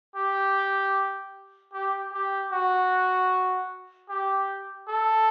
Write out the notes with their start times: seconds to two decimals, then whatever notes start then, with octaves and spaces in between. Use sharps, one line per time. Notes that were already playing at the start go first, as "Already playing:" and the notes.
0.16 G4
1.73 G4
2.13 G4
2.52 F#4
4.10 G4
4.88 A4